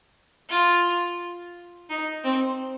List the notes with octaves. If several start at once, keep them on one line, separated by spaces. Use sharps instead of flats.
F4
D#4
C4